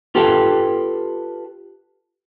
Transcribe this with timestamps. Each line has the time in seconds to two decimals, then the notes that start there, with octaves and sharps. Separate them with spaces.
0.15 F4 G4 A4 B4 F5 G5